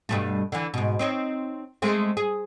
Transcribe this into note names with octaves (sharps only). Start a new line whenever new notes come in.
G2 B2 A3
D3 E3
G#2 B2
C4 D#4 C#5
G#3 A3 C4
G#4